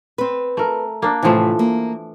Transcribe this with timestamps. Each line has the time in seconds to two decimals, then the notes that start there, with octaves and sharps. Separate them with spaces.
0.18 C4 B4
0.57 A3 A#4
1.02 A#3 D4
1.23 A2 C3 E3 F3 A3
1.59 A#3